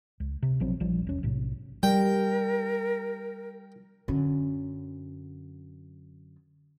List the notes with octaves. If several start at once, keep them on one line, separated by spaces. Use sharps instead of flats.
C#2
C3
A#1 F3 F#3 C4
A#1 F3 G3
E1 C#4
B1 A2 C3
G3 A#4 G5
F#2 D3